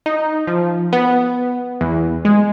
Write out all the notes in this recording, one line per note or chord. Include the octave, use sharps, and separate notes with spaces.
D#4
F3
B3
E2
G#3